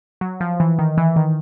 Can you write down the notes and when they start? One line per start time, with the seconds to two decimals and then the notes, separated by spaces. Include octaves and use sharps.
0.21 F#3
0.40 F3
0.60 E3
0.79 D#3
0.98 E3
1.16 D#3